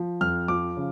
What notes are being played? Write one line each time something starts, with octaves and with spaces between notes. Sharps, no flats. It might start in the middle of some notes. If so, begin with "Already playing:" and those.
Already playing: F3
F2 F6
F3 D6
C#3